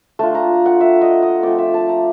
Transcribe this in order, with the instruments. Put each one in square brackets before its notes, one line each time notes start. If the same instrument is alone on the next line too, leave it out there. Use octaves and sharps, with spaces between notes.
[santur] A3 D4 F4 A5
A#5
F#5
E5
D#5
D#5
F3 A3 C4 D5
E5
A5
A#5